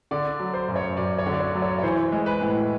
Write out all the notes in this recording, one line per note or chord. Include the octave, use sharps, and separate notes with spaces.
D3 D5
F#3
C5
F#2
C#5
F#2 D5
C#5
D3
D5
C#5
F#3
C#5
C#5
E3 C5
G#3
B4
A2